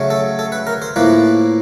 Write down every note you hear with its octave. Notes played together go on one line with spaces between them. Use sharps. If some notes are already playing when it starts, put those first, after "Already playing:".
Already playing: C#3 F#3 A3 C#4
A4
A4
B4
A#4
C5
A2 F3 A#3 B4